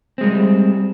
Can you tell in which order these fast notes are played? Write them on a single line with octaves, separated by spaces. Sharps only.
C4 G#3 G3